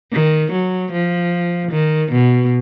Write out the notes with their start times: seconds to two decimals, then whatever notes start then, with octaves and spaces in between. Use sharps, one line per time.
0.12 D#3
0.52 F#3
0.92 F3
1.71 D#3
2.12 B2